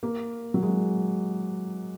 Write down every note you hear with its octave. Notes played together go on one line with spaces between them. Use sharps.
A#3
F#3
G#3